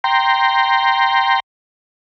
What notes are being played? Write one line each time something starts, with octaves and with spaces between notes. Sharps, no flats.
G5 A#5 C6